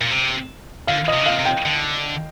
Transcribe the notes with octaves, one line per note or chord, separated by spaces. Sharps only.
A#2
C3
D3 F5
D#5
C3
D3
C3 F5
C3
G5
D3